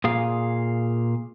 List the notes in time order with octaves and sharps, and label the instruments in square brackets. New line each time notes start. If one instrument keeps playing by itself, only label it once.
[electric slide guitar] A#2 G#4 F5